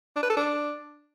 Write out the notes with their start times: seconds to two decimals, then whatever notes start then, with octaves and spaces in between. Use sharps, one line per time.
0.16 D4
0.23 B4
0.30 A4
0.37 D4